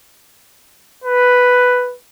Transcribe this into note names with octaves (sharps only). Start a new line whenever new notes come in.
B4